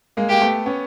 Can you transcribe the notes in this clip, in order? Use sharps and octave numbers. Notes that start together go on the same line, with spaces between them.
G#3 A#3
A#3 G4
A3 B3
B3 C#4